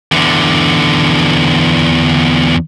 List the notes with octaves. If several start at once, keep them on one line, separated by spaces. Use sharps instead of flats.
E2 D3